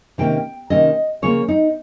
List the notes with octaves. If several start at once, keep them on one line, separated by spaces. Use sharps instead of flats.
C3 D#3 A#3 C#4 G5
C3 D#3 A#3 C#4 D#5
C#3 F3 A#3 C#4 C#5
D#4